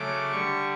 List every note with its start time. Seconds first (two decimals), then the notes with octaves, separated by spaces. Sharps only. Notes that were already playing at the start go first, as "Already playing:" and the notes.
Already playing: C#3 F#3 A3 D6
0.31 D3 G3 C#6